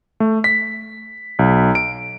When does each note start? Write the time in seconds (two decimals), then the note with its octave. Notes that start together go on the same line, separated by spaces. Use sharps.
0.20 A3
0.44 B6
1.39 B1
1.75 D7